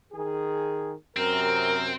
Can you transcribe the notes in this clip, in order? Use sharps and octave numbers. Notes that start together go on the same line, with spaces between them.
D#3 G#4
F#2 C3 C4 A#4